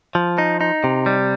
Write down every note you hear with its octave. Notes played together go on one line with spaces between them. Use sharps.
F3
D#4
D#4
C3
G3